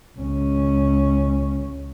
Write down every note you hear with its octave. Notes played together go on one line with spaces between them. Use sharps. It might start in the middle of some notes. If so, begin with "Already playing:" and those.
C#2 C#4